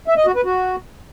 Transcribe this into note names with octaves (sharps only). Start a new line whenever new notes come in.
E5
D#5
F#4
B4
F#4